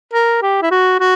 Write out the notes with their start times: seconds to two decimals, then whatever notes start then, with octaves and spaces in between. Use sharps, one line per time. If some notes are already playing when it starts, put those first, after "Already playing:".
0.13 A#4
0.42 G4
0.62 E4
0.71 F#4
1.00 F#4